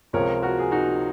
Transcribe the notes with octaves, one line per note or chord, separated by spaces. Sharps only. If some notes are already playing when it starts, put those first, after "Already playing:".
C#2 C3 F3 C4 A#4 C#5
F#4 A#4
G#4
D#4 F#4